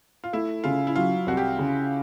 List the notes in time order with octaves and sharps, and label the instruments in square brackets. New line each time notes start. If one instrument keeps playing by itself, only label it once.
[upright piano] F4
[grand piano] A3 [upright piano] E4
[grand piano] C#3 [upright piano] F4
[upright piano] E4
[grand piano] F#3 [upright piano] F4
[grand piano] C2 [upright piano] F#4
[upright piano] G4
[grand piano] C#3